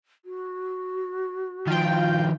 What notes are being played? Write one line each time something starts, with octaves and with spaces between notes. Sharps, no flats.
F#4
D#3 F3 F4 G5